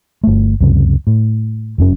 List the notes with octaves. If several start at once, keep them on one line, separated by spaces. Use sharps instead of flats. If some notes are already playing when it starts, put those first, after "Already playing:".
G1 A3
C#2 F#2 C3
A2
F1 F#2 C#4